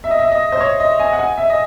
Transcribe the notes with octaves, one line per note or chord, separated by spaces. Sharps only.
E5
D#5
E5
D#5
C5
C#5
D#5
G#5
F#5
G#5
E5
D#5